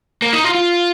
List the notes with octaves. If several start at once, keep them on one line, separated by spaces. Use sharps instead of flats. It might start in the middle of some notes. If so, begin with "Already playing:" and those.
A#3
D#4
F4
F4